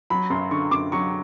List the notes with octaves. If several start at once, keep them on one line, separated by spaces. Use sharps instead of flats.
F#3 B5
F#2 C6
D3 C#6
F#2 D6
F#3 C#6